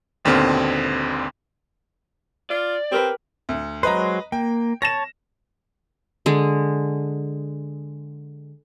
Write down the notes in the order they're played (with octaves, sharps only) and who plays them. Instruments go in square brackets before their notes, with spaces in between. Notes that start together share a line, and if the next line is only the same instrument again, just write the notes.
[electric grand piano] G#1 D#2 B2 D3 C4 F6
[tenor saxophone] F4 [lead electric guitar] D5
[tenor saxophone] C4 [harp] G4 A#4 B4
[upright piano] D2
[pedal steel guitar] F#3 G#3 C5 [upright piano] B4 D#5 A#5
[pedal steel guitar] A#3 [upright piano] G5
[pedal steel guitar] C#5 A5 [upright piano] A#6 E7
[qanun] D3 G#3